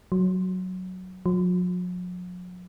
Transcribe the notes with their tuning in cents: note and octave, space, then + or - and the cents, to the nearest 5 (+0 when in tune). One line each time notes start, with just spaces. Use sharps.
F#3 +0
F#3 -45